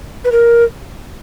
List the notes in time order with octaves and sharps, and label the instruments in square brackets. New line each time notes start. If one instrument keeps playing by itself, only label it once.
[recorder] B4
A#4